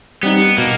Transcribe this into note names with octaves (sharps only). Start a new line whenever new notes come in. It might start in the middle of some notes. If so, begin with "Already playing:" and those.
G3 B3 C4 D#4
B2 A#3